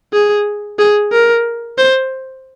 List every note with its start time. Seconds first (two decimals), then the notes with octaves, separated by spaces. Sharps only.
0.13 G#4
0.78 G#4
1.12 A#4
1.78 C5